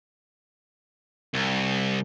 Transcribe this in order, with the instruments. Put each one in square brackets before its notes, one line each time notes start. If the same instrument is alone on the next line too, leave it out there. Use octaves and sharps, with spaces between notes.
[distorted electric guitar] C2